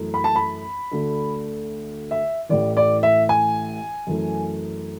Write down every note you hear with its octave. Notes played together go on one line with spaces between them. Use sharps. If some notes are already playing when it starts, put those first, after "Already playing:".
Already playing: F#2 E3 A3
B5
A5
B5
D2 D3 A3
E5
A1 A2 E3 D5
D5
E5
G#5
F#2 E3 A3